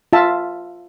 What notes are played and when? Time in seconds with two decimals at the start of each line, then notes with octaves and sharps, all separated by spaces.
0.13 F4 E5 A5